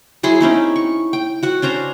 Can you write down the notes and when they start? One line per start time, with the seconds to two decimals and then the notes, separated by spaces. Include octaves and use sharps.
0.23 F#3 E4 G#4 C6
0.41 C4 C#4 D#4 E4
0.76 C#6
1.13 G5
1.43 F#4 F#5
1.62 C#4 D4 C5 A#5